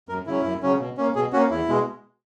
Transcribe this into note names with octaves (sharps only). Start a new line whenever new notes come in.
F#2 A#4
C#3 F#3 C#4 E4
F#2
C#3 F#3 C#4
B2
A#3 C#4
B2 G#4
A#3 C#4 F#4
E2 E4
B2 G#3